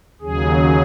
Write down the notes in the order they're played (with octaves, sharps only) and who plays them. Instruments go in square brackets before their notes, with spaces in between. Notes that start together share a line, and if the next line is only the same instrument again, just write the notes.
[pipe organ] D#2 C#3 F#3 G#4